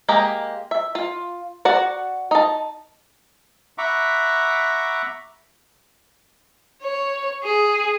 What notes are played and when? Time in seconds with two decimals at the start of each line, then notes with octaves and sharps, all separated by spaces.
0.09 G#3 A#3 G4 A#5
0.71 E5
0.95 F4
1.65 F#4 D5 F#5
2.31 D#4 A5
3.78 E5 F#5 A#5 B5 C#6 D6
6.81 C#5
7.42 G#4